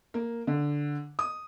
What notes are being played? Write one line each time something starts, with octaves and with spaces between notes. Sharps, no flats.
A#3
D3
D#6